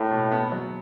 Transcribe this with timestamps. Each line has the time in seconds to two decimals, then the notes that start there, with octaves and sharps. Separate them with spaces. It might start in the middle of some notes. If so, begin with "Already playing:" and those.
Already playing: A2 E4
0.11 B2
0.31 B3
0.52 F#3